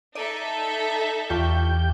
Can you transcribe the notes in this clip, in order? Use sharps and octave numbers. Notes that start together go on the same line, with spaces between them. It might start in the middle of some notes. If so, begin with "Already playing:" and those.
D#4 A4 D5 E5 D6 D#7
E2 F4 G4 D5 C#6 G6